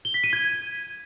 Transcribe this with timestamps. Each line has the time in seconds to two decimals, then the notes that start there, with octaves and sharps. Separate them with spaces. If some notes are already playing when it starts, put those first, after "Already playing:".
0.05 G7
0.14 B6
0.24 D#7
0.33 G#6